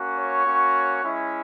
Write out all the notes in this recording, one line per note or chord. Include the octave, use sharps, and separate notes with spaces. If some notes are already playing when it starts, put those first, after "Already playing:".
Already playing: A#3 C#4 F#4
C#5
A#3 C#4 F#4
G#3 C#4 E4